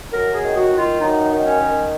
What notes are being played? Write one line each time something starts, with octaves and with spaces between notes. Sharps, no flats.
F#2 A#4
G#4
D#3
F#4
D#3
F4
F#2 D#4
D#3
C#4
D#3